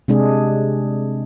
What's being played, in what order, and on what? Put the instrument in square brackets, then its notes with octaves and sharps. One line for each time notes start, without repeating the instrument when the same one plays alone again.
[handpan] C3 G#3 D4 G#4